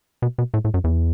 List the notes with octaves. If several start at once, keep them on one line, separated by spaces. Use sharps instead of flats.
B2
B2
A2
A2
F#2
E2